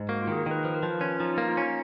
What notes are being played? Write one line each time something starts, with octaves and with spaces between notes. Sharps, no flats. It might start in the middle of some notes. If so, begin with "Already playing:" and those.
Already playing: G#2
A#3 F#4
F4
D#3 G#4
A#4
D#3 B4
F3 B4
A#4
F3 B4
C#4 F4
F3 D#4
A#3 D#4
F4
C#4 D#4